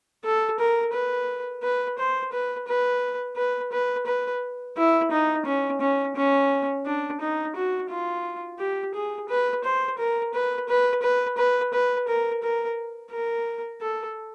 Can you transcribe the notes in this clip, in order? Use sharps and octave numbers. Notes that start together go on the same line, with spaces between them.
A4
A#4
B4
B4
C5
B4
B4
B4
B4
B4
E4
D#4
C#4
C#4
C#4
D4
D#4
F#4
F4
G4
G#4
B4
C5
A#4
B4
B4
B4
B4
B4
A#4
A#4
A#4
A4